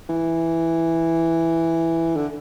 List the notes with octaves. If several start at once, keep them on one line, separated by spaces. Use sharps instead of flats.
E3
D3